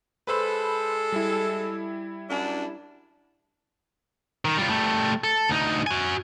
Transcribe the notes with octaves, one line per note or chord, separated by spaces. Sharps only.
G#3 A4 B4 C5 B5
G3 E4
F#2 D4
D#3
G3 F4
G3 A3
A4
D2 D#4
F#4 G#5